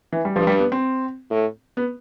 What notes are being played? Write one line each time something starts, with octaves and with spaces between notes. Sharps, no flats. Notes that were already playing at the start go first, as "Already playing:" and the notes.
E3
G3
G2 F3
G3
B3
C4
A2
B3